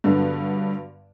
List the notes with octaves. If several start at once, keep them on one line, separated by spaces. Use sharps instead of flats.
G2 D3 F#3 B3